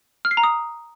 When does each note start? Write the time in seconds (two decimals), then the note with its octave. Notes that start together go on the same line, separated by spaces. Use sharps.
0.25 F6
0.31 C7
0.37 A#5
0.44 D#6